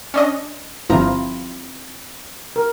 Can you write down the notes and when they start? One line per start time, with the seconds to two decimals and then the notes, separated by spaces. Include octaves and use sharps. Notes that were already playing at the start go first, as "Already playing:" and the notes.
0.14 C#4 D4 D#5
0.89 G1 F3 C4 E4 F4 A#5
2.56 A#4